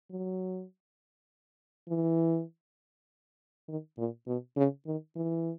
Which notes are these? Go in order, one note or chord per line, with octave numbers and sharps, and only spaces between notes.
F#3
E3
D#3
A#2
B2
C#3
D#3
E3